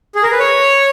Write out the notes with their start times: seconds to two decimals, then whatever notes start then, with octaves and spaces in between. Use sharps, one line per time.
0.15 G#4
0.23 A#4
0.32 B4
0.39 C#5